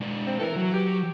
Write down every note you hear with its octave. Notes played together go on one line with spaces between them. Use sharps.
G#3 D4
C4
E3 A4 A#4
F#3
G4